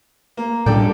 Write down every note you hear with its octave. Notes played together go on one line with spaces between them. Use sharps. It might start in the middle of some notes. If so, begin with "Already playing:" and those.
A#3
A2 G3 D4 A4 D5 G5